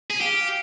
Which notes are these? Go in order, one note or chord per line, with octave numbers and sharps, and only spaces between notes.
G#4
G4 F5